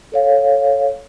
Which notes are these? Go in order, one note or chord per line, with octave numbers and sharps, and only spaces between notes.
A4 C#5 F5